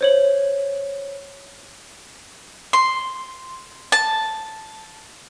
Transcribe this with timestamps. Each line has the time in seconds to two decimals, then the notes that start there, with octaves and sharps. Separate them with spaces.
0.01 C5 C#5 F#7
2.73 C6
3.92 A5